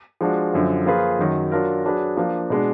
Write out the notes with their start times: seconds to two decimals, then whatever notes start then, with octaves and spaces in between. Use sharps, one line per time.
0.21 F3 G#3 D4 F#4
0.53 F#2 D3 F3
0.86 F3 A#3 F4 G#4 B4
1.19 F#2 D#3 F#3
1.52 F#3 D4 F4 A#4
1.85 F#3 D4 G#4 B4
2.17 F3 A#3 D4
2.50 B2 G#3 D4